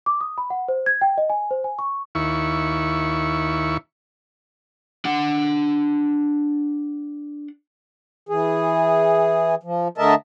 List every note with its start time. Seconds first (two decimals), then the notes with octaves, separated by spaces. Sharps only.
0.06 D6
0.21 D#6
0.38 B5
0.50 F#5
0.68 C5
0.86 G#6
1.01 G5
1.18 D#5
1.30 G#5
1.51 C5
1.64 G#5
1.79 C#6
2.15 D#2 E4 C#6
5.05 D4 F#5
8.29 E3 G#4
9.63 F3
9.98 D3 A3 A#4 D#5 E5 A5